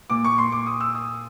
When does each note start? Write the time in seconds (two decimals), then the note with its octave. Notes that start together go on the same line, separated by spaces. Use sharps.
0.10 A#2 D6
0.24 C#6
0.38 C6
0.52 D6
0.66 D#6
0.81 E6
0.95 D#6